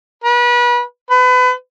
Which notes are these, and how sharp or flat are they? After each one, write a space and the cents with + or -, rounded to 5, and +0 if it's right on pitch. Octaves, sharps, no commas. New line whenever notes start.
B4 -30
B4 +30